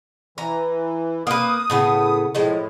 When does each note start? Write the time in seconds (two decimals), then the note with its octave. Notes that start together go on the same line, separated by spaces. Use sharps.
0.38 E3 A#5
1.27 A#3 B4 D#6
1.70 A2 C#3 B3
2.35 A2 F3 G#3